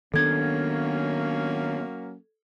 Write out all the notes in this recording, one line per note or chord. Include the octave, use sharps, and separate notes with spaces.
D#3 F#3 A#3 B3 C#4 D4 A4 G#6